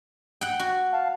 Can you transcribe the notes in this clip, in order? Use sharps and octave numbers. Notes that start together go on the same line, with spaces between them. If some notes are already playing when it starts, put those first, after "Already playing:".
F#5 G5
F#4
F5 A5